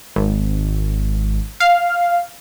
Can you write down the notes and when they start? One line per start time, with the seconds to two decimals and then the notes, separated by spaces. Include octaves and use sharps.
0.16 G#1
1.60 F5